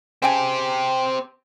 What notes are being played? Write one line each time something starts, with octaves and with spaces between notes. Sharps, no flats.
C#3 C4 G4 G5 G#5